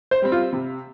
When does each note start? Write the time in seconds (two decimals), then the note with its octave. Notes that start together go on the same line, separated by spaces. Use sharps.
0.11 C5
0.22 G3 C4
0.32 F4
0.53 C3